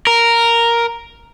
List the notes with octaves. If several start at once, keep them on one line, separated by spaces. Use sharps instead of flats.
A#4